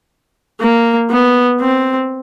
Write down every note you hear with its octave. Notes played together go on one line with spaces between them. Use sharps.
A#3
B3
C4